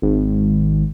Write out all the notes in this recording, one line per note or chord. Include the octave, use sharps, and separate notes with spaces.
G#1